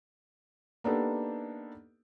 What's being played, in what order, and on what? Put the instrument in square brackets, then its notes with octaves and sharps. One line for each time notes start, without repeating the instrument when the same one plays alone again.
[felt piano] A#3 B3 D4 D#4 G4 A4